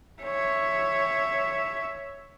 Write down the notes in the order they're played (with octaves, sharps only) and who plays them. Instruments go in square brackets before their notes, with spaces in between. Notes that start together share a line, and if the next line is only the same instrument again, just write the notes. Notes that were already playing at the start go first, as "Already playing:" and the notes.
[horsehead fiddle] C#5 E5